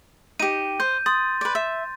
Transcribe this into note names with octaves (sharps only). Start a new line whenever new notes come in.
D#4 G4 D#7
C5 G6
C6 D#6 A6
B4 D5
E5